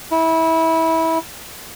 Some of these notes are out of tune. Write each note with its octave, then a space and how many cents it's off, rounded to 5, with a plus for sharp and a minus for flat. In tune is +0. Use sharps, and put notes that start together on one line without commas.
E4 -20